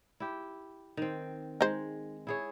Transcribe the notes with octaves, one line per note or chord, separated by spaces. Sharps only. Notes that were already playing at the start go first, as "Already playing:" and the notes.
E4 G4
D#3 C4
G#3 D#4 C5
E4 G#4 C#5